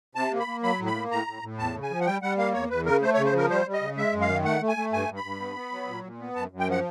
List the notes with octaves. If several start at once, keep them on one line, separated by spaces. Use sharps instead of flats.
C3 A5
A#3
B5
A#3
F#3 B5
A2
B5
A#3
A2 A#5
A2
A2
E2 A5
C#3
G#5
F3
F#5
G3 G5
G3 F#5
A#3 F5
E2 C#5
E2 B4
C#3 A#4
A3 C5
C#5
C#3
C5
F3 A#4
G3 C5
G3
D#5
C#3
G#3 E5
F#2
F5
D#3
A3 F#5
A3
G#5
A3
G2 G#5
G2
B5
G2
B3
B3
F#3
A#2
A#2
B3
F#2 A5
F#2
G5
F3 F#5